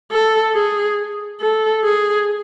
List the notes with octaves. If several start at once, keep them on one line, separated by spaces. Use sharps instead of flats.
A4
G#4
A4
G#4